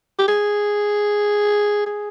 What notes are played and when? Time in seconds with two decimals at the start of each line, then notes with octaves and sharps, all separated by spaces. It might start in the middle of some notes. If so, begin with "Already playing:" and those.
0.19 G4
0.28 G#4
1.86 G#4